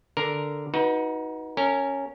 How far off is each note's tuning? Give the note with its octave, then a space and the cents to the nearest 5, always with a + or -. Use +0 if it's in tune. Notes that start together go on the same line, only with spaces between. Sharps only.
D3 +0 A#4 +0
D#4 +25 F#4 +0 B4 -20
C#4 +0 A#4 -25